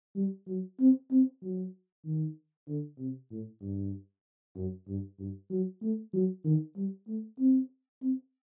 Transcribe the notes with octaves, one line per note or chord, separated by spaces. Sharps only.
G3
F#3
C4
C4
F#3
D#3
D3
C3
A2
G2
F#2
G2
G2
F#3
A3
F#3
D#3
G3
A3
C4
C4